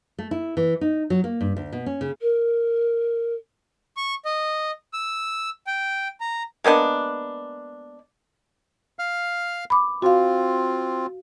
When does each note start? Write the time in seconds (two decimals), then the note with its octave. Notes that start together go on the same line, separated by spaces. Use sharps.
0.19 A3
0.31 E4
0.57 E3
0.81 D#4
1.10 F#3
1.24 A#3
1.41 G2
1.57 D2
1.73 B2
1.86 C#4
2.01 C#3
2.20 A#4
3.97 C#6
4.25 D#5
4.93 E6
5.67 G5
6.20 A#5
6.64 G#3 A#3 B3 D4
8.99 F5 F6
9.70 B5 D6
10.02 C4 F4 F#4 F5